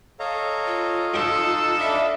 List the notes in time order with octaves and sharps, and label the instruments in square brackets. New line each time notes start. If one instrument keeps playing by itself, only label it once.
[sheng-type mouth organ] A4 C#5 A#5 [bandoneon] D#5 F5
[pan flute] F4
[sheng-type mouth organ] D#4 [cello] A4
[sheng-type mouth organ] D4 B5 D6 [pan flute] E5